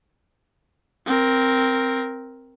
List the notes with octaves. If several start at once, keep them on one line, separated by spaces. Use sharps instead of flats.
C4 A#4